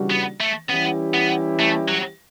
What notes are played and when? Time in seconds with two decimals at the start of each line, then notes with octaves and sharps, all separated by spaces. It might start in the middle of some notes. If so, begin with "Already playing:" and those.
Already playing: C#3 E3 G3 D4 F#4
0.10 B3
0.41 A3
0.70 E3 G3 B3 C#4 E4 G4
1.14 B3
1.59 A3
1.88 F#3